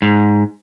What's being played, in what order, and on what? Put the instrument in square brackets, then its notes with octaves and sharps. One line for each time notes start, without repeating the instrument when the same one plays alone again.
[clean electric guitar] G#2